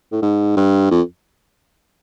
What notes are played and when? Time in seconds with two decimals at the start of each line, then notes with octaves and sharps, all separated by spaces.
0.12 A2
0.22 G#2
0.57 G2
0.91 F2